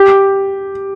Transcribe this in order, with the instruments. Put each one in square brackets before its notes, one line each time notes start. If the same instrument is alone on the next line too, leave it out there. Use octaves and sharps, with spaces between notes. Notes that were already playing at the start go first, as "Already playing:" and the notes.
Already playing: [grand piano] G4